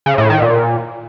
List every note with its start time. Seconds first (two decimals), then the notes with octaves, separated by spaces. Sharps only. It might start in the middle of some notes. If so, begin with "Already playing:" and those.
0.06 C#3
0.18 A2
0.30 D#3
0.42 A#2